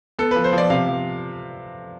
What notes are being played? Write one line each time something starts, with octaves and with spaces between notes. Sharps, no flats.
B3 A4
B4
F3
C5
F3
D5
C3 F5
F3